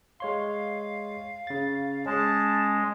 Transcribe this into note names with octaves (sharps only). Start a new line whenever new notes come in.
G#3 C#5 F5 C6
C#3 A6
G#3 C#4 G#4 A5